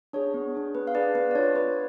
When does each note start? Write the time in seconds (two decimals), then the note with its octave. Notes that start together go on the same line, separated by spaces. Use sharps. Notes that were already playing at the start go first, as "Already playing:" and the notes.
0.13 D4 G#4 C#5
0.34 B3
0.55 D4 G#4
0.75 B3 B4
0.87 F5
0.95 D4 G#4 B4 D5
1.15 B3 B4
1.31 D5
1.35 D4 F4 C#5
1.56 B3 B4